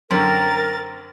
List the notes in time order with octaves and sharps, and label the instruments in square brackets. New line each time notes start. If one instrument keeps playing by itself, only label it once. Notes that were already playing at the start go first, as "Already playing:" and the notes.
[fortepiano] F#2 D3 [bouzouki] C4 [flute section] A#4 [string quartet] A6